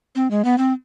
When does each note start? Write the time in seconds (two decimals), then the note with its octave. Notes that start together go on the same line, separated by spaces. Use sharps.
0.15 C4
0.31 G#3
0.44 B3
0.58 C4